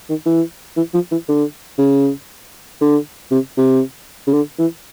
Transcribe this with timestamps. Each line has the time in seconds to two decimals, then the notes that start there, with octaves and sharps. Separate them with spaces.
0.09 D#3
0.26 E3
0.77 E3
0.94 F3
1.11 E3
1.28 D3
1.79 C#3
2.81 D3
3.31 C3
3.58 C3
4.27 C#3
4.33 D3
4.59 E3